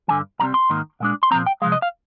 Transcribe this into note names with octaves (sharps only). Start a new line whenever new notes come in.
G2 D3 F3 G#5
C2 C3 G3 C4 A#5
C6
G#2 D#3 A#3
A#2 G#3 D4
C6
A#2 F3 C4 A#5
G5
C3 F3 G#3 F5
D#5
F5